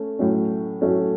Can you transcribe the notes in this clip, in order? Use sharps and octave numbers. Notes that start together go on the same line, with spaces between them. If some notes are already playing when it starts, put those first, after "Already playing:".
Already playing: A3 C#4
A2 F#3 A3 C#4
A2 F#3 A3 C#4